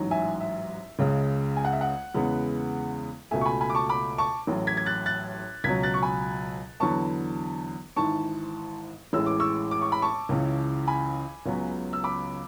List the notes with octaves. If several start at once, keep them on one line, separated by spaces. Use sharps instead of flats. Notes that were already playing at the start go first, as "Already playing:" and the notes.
Already playing: A1 G#2 F#3
E5 G#5
E5
C#2 C#3 G#3
G#5
F#5
E5
F#5
E2 C#3 G#3 B3
C#2 B2 A3 E5 G#5
C#6
G#5 B5
G#5 B5
D6
A5 C#6
B5 D6
A5 C#6
A1 A2 F#3
G#6 B6
G#6
F#6 A6
F#6 A6
C#2 B2 F#3 G#6 B6
F#6 A6
C#6
G#5 B5
E2 D3 F#3 B3 A5 C#6
G#1 G#2 E3 A5 C#6
A1 A2 E3 G#3 E6
D6
C#6 E6
D6
C#6
B5
A5 C#6
C#2 C#3 E3
G#5 B5
C#2 C#3 F#3 B3
E6
B5 D6